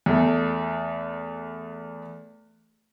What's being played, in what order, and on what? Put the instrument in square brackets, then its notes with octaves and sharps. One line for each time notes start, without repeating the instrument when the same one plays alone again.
[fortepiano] E2 A3